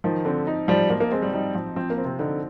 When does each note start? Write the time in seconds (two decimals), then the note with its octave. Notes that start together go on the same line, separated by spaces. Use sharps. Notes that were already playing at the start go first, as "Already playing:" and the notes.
0.04 D#3 F3
0.25 D3 C4
0.47 D#4
0.68 F3 G3
0.90 F3 A#3
1.00 A#3
1.12 G#3 C4
1.22 G3
1.33 G3 D#4
1.55 F3
1.76 F3 C4
1.90 A#3
1.98 C4
2.05 C3
2.19 D3 D#4